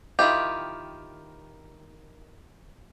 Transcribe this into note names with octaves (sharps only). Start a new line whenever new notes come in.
D#3 E4 F4 G4